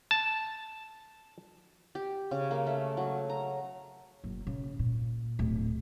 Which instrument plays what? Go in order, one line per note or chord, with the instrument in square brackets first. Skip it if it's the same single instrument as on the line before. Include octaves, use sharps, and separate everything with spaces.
[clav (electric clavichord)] A5
[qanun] G4
C#3
A#3
A3
F#3
A#5
[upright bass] F#1
C#3
A#2
D1